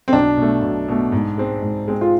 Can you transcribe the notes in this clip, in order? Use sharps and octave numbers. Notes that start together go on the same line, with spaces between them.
C4
B1 D4
B2
A3
B1
B2 A3
G#2
G#3 C4
G#2
G#3 C4
F4